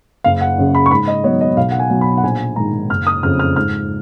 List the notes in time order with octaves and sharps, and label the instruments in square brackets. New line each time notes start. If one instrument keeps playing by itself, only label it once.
[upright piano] F#1 F5
F#5
F#2 C#3
B5
C#6
G#2 B5
D#5
D#3 F#3 B3 C#5
D#5
B1 F5
F#5
G#5
B2 F#3 B3
B5
F#5
A#1 G#5
G#2 D#3 A#5
F#1 F6
D#6
F2 C#3 F6
F6
G#2 F6